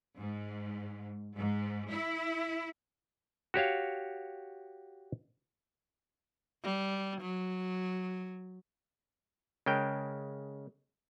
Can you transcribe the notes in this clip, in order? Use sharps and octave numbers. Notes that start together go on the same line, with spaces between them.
G#2
G#2
E4
F#4 G4 C#5 F5
G3
F#3
C#3 G#3 A#4 G5